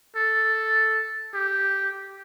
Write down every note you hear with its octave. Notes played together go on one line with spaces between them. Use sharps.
A4
G4